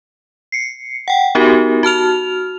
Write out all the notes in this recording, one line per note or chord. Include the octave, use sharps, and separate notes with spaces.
C7 C#7
F#5 G5
B3 D#4 F#4 G4 A#4
F#4 A5 F6 F7